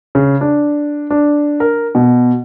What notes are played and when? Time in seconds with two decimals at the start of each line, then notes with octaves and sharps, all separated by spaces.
0.15 C#3
0.41 D4
1.10 D4
1.60 A#4
1.95 B2